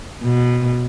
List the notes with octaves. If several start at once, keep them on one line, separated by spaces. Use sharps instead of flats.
B2